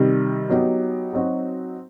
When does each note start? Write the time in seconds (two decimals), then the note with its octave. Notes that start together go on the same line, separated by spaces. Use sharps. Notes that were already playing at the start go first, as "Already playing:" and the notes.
Already playing: C3 D#3 G3
0.49 F#3 B3 D#4 G4
1.13 F#3 C4 D#4 F#4